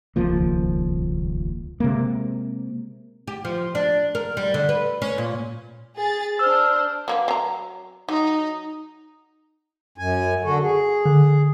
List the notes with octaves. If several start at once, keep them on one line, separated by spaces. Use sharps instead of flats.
D#1 C#2 F3 A#3
C3 G#3 A#3
G4
F3
D4
A#4
G3
D3
B4
C#4
A#2
G#4 A6
D4 C5 E6 F6
F#3 A#3 B4
F#3 A#5
F#3 D#4
F#2 G#5
D3 F#4 A4
G#4
D3